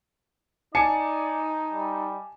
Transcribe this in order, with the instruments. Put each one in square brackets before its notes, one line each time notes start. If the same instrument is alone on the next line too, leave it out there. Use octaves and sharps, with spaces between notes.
[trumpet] D#4 [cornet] D5 [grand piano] G#5 A5 C#7
[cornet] G3